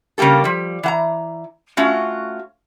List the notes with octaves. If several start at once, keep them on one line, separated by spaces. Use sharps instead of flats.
C#3 G3 A#3 G4 A4
F3 G3
E3 F#5 A#5
A3 C#4 F4 F#4